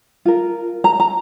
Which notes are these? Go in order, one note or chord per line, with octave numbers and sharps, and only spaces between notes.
F4 A#4
A#5
A#5